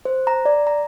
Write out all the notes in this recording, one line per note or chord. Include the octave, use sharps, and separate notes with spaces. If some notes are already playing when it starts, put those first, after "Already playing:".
C5
A#5
D5
A#5